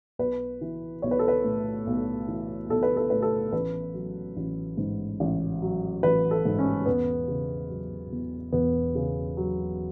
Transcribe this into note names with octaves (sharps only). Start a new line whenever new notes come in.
B1 B4
E3
B1 C#5
B4
A4
B4
A2
B1
E3
B1 A4
B4
A4
A2 B4
A4
A1 B4
F#3
A1
G#2
A1
F#3
A1 B4
A4
G#2
C#4
E1 B3
C#3
F#3
E2
E1 B3
C#3
F#3